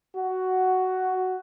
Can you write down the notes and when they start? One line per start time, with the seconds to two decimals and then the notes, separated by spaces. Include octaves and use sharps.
0.16 F#4